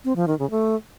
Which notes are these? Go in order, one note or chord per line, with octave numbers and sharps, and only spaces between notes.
C4
F3
D#3
C#3
A3